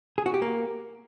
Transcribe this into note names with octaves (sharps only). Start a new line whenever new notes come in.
G#4
F#4
G4
A#3